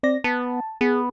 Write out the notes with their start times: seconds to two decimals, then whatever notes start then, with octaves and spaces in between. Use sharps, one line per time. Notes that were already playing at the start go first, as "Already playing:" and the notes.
0.03 C4 D5 A#6
0.24 B3 A5
0.81 B3 G#4